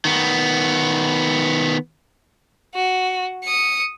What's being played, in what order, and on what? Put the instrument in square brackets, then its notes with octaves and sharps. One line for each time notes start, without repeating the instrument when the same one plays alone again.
[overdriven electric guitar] D#3 B3
[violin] F#4
D#6 C#7